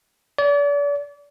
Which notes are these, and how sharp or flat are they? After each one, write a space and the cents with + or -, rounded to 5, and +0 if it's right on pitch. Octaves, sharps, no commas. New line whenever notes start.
D5 -40